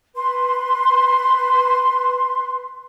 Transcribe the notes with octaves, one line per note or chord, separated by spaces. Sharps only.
B4 C6